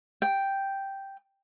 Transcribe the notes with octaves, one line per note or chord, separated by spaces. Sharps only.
G5